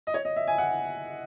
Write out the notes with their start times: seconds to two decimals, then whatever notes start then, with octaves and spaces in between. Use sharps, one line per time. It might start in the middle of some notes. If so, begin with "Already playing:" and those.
0.07 D#5
0.14 C#5
0.25 D#5
0.36 E5
0.47 G#5
0.58 F#5